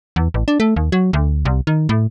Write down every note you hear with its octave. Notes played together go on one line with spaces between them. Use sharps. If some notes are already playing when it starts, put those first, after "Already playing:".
E2
A1
D4
A3
D#2
F#3
D2
C2
D#3
A2